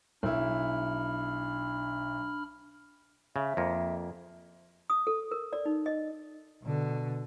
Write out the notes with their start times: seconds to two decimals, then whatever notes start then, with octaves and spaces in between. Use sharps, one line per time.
0.23 B1 D4 E4 B5 F6
3.36 C#3 E5
3.57 F2 A#3
4.90 D#6
5.07 A4
5.31 A#4
5.53 D5
5.65 D#4
5.86 D#5
6.63 B2 D3